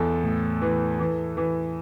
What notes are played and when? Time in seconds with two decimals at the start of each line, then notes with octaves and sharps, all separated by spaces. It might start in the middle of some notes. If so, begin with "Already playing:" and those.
Already playing: E2 A4
0.24 A2
0.62 E3
0.99 E3
1.37 E3